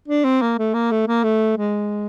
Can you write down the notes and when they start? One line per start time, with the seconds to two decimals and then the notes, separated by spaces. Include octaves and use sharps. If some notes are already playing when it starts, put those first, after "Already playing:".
0.08 D4
0.24 C4
0.42 A#3
0.59 A3
0.74 A#3
0.91 A3
1.07 A#3
1.24 A3
1.58 G#3